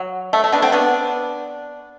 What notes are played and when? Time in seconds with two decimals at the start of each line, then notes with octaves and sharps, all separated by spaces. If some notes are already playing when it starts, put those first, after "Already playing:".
Already playing: F#3
0.33 A3
0.44 A3
0.52 B3 D4
0.62 A3 C4
0.72 B3 D4